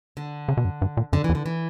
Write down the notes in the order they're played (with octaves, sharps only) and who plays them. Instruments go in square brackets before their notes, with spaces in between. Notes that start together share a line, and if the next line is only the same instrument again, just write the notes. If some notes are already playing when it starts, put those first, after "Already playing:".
[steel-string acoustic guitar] D3
[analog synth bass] C#3
B2
F#2
G2
A#2
[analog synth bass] F#2 [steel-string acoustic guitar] D3
[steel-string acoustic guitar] E3
[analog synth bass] E2
[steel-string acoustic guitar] D3
E3